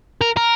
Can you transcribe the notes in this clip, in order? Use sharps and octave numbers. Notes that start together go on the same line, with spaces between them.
A#4
A#4